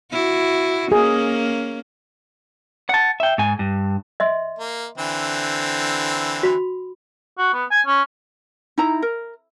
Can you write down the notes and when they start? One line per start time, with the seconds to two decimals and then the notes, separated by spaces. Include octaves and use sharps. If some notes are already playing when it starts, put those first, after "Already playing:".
0.11 E4 F#4
0.92 A#3 C#4 G#4
2.89 F#5 A5
3.20 E5 G5
3.38 G#2 G#5
3.59 G2
4.20 D#5 E5 C6
4.59 A#3
4.98 D3 E3 C4
6.43 F#4 B5
7.38 F#4
7.54 B3
7.71 G#5
7.87 C#4
8.78 D#4 E4 A#5
9.02 A#4